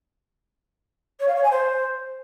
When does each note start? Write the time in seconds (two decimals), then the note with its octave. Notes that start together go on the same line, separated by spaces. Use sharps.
1.20 C#5
1.28 F5
1.36 C#5
1.44 G#5
1.51 C5